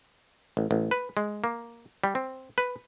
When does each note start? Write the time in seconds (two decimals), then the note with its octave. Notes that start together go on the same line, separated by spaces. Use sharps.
0.57 A1
0.71 A1
0.91 B4
1.17 G#3
1.44 A#3
2.04 G3
2.15 C4
2.58 B4